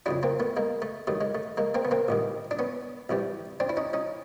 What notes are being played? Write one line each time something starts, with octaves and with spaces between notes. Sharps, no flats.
F2 C#3 F#3 D4 E4
A#3 C4
A3 B3
G#3 A#3
A3
G2 D#3 F#3 A3
G#3
A3
G#3 A#3
A#3 C4
B3
A#3 C4
A1 G2 D#3
D4
B3 C#4
C2 C3 E3 G3
C4 D4
E4
C#4 D#4
C#4 D#4